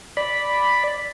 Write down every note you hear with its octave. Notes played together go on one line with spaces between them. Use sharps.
D5 B5